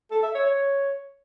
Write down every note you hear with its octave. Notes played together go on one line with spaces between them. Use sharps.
A4
E5
C#5
C#5